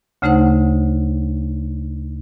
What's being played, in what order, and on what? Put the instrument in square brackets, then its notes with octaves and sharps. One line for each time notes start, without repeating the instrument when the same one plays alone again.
[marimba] D2 C#3 A3 D#4 C5 F#5